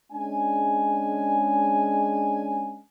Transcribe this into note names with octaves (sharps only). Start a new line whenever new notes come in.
G#3 C#4 D4 G#5